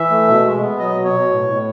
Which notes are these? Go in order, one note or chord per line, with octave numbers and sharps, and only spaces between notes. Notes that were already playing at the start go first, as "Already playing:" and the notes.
Already playing: E3 E5
A3
B2
G#3
B3
F#3 D#5
B2
C#5
B2
A2
A2